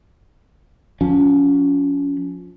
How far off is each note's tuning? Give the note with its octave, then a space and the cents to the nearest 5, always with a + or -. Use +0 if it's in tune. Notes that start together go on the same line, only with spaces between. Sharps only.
F3 +25 C#4 +25